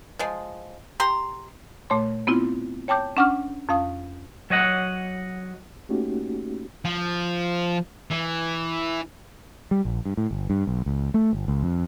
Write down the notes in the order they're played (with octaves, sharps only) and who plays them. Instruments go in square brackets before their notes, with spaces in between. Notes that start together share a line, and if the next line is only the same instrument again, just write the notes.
[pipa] F3 G#3
G4 A#5 C6
[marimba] A#2 A3 C#5 C6
B3 C4 E4 F4
C#5 G5 A5 D6 G6
C#4 D4 F#5 C#6 D6 F6
F2 C#4 F5 D#6
[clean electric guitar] F#3 C#5 D#5 F#5
[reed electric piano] A3 A#3 C#4 D#4 F#4 G4
[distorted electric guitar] F3
E3
[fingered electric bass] G3
A#1
G2
A2
G1
G2
B1
C#2
A3
G1
C#2
F2